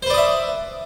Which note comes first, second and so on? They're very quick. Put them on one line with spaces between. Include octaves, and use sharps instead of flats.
C5 B4 D5 D#6 E5